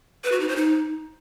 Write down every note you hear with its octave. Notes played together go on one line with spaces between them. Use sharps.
B4
F#4
D#4
C5
D#4